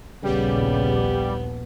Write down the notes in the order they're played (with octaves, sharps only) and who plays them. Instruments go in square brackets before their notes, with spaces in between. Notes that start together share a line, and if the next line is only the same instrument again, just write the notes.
[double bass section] A#1 D#2 [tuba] C#3 [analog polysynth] G3 G4 [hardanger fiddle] B3